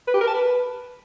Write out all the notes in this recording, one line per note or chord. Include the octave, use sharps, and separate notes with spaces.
B4
G4
A#4
A5
B4